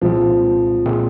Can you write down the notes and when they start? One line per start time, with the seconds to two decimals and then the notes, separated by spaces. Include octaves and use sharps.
0.01 C2 A#2 F3 G#3 C4 F4
0.86 A#2 G#3 C4 F4